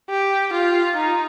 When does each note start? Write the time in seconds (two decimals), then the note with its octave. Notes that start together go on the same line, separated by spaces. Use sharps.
0.10 G4
0.53 F4
0.96 D#4